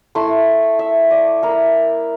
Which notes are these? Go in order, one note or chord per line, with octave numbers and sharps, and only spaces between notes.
A3 E4 C6
E5
D5
A#3 E4 A#4